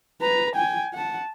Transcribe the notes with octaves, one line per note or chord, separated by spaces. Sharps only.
B4 A#5
G5 G#5
F#5 A5